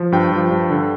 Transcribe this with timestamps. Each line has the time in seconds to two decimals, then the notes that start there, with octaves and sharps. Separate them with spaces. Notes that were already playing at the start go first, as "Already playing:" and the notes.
Already playing: F3
0.12 G2 G5
0.32 F3
0.51 G2
0.70 D3